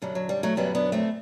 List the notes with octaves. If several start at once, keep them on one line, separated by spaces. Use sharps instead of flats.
F#2 D3 F#3 G3
F#3
G3
F#3 A3
F#2 D3 F#3 G3 B3
B3 D4
A3 C4